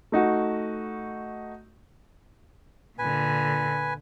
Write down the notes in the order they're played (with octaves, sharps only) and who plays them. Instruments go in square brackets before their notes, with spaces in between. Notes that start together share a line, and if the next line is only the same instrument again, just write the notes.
[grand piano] A3 D#4 F#4
[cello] A#2 D3 [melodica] B4 G#5